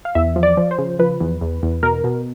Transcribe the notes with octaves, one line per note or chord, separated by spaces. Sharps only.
F5
E2 E5
F3
D5
F3
C5
C#3
F3 B4
E2
E2
E2
B2 A#4
B2